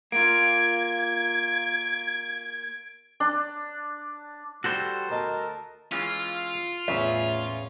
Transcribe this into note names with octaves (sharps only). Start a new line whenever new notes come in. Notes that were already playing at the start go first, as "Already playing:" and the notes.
A#3 F4 G#6 D7
D4
G3 F#4 A4 C5
D2 A#4 D#5 A5
E3 G#3 C#4 F4
E2 A2 C#3 C#4 E5